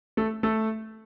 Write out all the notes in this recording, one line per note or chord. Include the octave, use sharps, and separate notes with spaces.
A3 A4
A3 A4